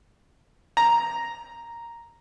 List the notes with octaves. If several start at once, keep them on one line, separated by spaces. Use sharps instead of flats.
A#5